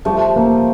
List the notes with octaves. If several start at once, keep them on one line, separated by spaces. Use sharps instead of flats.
F3 G3 A3
A#3